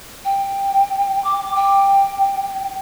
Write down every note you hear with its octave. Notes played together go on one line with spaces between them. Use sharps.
G5
D6
G5